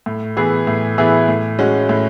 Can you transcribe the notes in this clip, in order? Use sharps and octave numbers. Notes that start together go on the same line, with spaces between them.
A2
E3 B3 E4 G#4
A2
E3 B3 E4 G#4
A2
G#3 C#4 F#4
A2